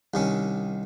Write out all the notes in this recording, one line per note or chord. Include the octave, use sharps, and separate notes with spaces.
C2 D#3 C#4